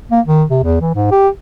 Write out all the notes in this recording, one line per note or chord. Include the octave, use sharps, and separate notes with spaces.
A#3
D#3
C3
E2
E3
G#2
G4